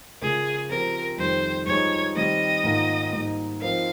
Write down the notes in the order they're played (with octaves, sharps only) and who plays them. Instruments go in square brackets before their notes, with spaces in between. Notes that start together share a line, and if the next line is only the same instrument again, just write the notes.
[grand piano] C#3 G#3 C#4 F4 A#4 [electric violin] G#4
[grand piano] F3 C4 G4 [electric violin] A#4
[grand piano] F2 D#3 G3 [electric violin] C5
[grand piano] G2 F3 G#3 D#4 [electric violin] C#5
[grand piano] D#3 G3 C4 [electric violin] D#5
[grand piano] G#2 D#3 A#3 F4 A#4
G#2 G3 A#3 D#4
[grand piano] F3 C4 D#4 A#4 [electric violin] F5